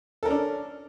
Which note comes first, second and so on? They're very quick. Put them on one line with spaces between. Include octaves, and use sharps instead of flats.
A4 A#4 C#4 D4